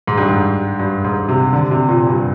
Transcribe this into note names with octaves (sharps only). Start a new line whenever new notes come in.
G#2
G2
G#2
G2
G#2
C3
D3
C3
A#2
G2